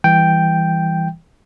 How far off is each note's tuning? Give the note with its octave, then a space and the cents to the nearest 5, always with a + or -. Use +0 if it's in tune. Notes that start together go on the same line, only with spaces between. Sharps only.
E3 +0 G3 +15 G5 +0